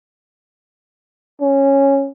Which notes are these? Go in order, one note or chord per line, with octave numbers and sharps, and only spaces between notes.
C#4